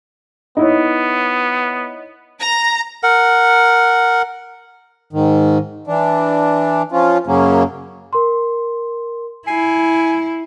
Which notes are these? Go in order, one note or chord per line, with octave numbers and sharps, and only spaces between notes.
B3 D#4 E4 C#5
A#5
A#4 F#5
G#2 D#3
E3 D4
F3 C#4 F4
F#2 C#3 F#3 A#3 C#4
A#4 C6
E4 G#5 C7